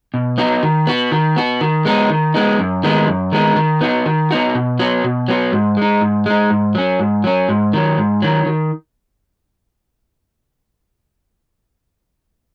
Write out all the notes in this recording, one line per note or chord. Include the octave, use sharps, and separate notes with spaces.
B2
B3 D#4 F#4
D#3
B3 F#4
D#3
B3 F#4
D#3
G#3 B3 D#4
D#3
G#3 B3 D#4
F#2
D#3 G#3 B3 D#4
F#2
D#3 G#3 B3 D#4
D#3
B3 D#4 F#4
D#3
B3 D#4 F#4
B2
F#3 B3 F#4
B2
F#3 B3 F#4
G#2
G#3 D#4
G#2
G#3 D#4
G#2
F#3 C#4
G#2
F#3 C#4
G#2
D#3 F#3
G#2
D#3 F#3
D#3